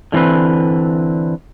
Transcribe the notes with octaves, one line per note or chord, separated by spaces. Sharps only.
D3 E3 B3 C4 B4